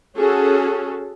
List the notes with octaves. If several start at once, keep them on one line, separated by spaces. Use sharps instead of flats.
C#4 F#4 G#4 A4